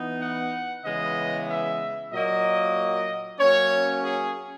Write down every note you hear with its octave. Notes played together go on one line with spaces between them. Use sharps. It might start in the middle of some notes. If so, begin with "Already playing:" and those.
Already playing: E3 B3 D#4
F#5
C#3 E3 G#3 B3 D#5
E5
A#2 F#3 A#3 D#5
F#3 A#3 C#4 C#5
G#4